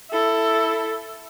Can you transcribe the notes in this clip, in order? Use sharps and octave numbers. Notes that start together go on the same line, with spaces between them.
E4 A4